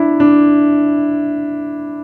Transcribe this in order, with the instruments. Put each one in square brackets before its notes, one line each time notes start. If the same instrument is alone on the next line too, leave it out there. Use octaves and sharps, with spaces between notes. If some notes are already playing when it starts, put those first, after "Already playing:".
Already playing: [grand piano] D4 E4
D4